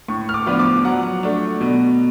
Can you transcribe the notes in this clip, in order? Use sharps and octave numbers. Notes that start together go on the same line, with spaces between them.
A2 C#6
F6
D6
F3 B3 D4 F4
D6
F#3 F#5
A3 D4
B2